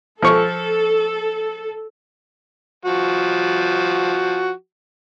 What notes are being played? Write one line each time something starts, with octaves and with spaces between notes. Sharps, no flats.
F3 A4 C#6
F3 F#4